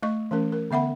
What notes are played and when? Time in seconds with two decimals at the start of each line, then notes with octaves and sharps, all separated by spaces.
0.03 A3 D#5 C#6
0.31 E3 A3 C#4 A#4
0.52 A#4
0.71 D3 B3 E5 F#5 B5